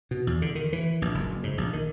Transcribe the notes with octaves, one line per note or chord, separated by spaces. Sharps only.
B2
E2
D3
D#3
E3
A#1
F#1
G#2
A#1
D#3